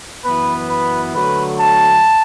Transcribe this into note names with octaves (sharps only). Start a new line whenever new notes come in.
F#2 E3 B3 B4
B4
D3 F#3 A3 B4
A5